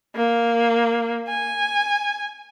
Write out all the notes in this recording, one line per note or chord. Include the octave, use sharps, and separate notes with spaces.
A#3
G#5